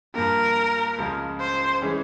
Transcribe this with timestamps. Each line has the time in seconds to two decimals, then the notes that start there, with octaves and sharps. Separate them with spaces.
0.15 G2 F3 A#3 A#4
0.98 C#2 C#3 F3 G#3
1.40 C5
1.82 E3 G#3 C#4